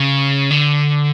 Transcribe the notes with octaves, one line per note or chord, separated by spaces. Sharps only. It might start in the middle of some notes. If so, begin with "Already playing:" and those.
Already playing: C#3
D3